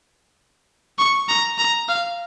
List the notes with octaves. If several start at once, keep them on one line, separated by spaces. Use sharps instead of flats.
C#6
A#5
A#5
F5